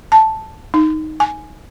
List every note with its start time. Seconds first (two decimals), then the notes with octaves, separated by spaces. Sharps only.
0.12 A5
0.74 D#4
1.20 G#5